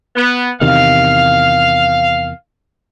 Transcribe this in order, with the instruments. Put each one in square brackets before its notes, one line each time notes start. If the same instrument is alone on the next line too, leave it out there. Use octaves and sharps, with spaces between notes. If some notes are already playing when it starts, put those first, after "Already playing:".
[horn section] B3
[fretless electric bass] E2 C3 D#3 [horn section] F5